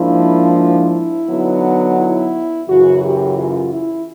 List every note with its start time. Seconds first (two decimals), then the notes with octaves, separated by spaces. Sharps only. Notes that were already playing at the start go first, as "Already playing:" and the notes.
Already playing: G#2 F3 A#3 D4 E4
0.58 E4
1.28 D3 F#3 B3 D#4
1.98 E4
2.68 F#2 C#3 E3 F#4
3.03 G4
3.38 F4
3.73 E4